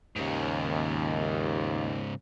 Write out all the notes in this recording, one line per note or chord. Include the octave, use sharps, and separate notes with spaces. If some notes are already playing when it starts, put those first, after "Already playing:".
D#2 G#2 C#3